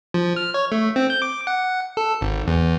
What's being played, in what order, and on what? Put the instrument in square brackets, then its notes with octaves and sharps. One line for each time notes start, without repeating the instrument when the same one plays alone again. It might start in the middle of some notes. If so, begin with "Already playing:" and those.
[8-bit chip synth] F3
F6
C#5
A3
C4
G6
D6
F#5
A4
G#1
E2